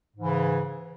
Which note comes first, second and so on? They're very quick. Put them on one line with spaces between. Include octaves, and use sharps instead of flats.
G#2 E3 C#3